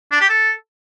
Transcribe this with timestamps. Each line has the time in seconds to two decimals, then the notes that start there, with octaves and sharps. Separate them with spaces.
0.12 D4
0.20 G4
0.29 A4